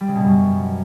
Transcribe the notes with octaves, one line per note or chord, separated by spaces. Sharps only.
G3
C#3
B2
F#2